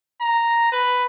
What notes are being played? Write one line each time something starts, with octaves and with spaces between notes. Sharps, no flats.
A#5
B4